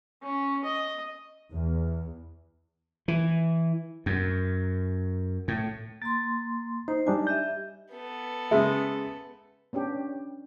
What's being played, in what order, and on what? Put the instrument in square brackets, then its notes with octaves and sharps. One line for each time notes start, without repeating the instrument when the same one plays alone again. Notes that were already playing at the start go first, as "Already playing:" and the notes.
[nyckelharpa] C#4
D#5
[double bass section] E2
[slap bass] E3
F#2
A2
[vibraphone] A#3 C6 [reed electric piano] A6
[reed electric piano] D#4 [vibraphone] C5
[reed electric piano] G3 D4 D#4 [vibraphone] G#5
[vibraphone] G4 D#5 E5 [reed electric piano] G6
[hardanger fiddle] B3 A4
[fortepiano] C#3 G#3 [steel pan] E5
[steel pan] B3 C#4 D4 G4